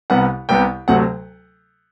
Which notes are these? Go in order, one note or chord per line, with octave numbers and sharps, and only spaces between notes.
C2 C3 G3 B3 F#5
C2 C3 G3 B3 G5
D2 C3 F#3 A3 F#5